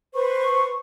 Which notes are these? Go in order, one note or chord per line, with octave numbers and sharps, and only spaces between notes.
B4 C5 B5 C#6